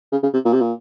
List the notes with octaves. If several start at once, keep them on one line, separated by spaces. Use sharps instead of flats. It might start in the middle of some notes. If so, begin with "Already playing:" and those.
C#3
C#3
C3
A#2
C3
A#2